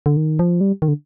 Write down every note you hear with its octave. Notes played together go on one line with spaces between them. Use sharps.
D3
D#3
F3
G3
D#3
D3